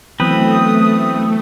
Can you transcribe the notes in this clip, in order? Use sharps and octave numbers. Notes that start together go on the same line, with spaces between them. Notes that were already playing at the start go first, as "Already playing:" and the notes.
E3 F#3 A3 B3 C4 B4 D#6